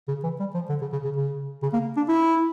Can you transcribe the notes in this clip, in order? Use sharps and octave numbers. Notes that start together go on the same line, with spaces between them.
C#3
E3
G3
F3
D3
C#3
C#3
C#3
C#3
C#3
A#3
D4
E4